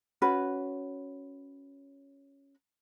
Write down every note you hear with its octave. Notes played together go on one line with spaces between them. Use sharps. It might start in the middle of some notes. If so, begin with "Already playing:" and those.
C#4 F#4 B4 B5